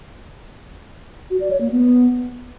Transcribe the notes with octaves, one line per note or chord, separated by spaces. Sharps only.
F#4
D5
C#5
A#3
B3